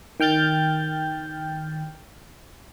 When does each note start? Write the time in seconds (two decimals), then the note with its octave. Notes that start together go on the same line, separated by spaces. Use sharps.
0.20 D#3 G5 F6 G6 A6